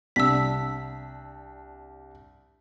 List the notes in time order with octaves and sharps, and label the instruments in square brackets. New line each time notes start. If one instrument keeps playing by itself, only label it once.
[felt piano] C2 D4 [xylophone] E6 B6